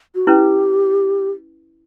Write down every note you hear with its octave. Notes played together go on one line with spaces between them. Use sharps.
F#4
C#4 E4 G4 B4